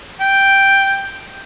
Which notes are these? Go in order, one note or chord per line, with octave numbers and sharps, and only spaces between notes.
G5